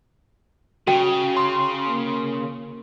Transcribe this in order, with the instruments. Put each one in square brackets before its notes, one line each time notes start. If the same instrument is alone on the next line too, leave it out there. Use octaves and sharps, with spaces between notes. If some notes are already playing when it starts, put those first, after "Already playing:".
[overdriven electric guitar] C#3 [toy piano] F#4 G5
[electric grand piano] C6
[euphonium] A#3